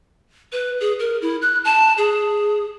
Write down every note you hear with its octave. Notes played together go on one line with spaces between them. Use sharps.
B4
G#4
A#4
E4
F#6
A5
G#4